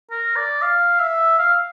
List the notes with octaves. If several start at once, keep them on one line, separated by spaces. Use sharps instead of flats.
A#4
D5
F5
E5
F5